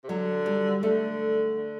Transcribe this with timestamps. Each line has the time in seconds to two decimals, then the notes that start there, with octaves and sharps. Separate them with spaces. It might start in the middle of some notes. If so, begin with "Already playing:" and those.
0.04 C3
0.09 D3 F#3
0.46 G3
0.83 D3 A3
1.57 D3